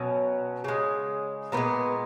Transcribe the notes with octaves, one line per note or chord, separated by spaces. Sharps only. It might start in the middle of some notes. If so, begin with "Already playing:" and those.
Already playing: B2 F#3 C#4
C#3 G#3
A#2 F3 G#3 B3